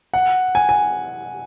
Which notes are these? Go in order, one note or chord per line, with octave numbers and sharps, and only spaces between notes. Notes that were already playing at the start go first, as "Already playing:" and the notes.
F#5
G#5
G#5